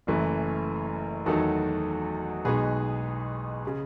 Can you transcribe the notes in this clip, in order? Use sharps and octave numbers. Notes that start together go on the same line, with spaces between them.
F#1 F#2 E3 A3
E2 D#3 F#3 A3 D#4 F#4 A4
B1 B2 G#3 B3 D#4 G#4 B4
C#3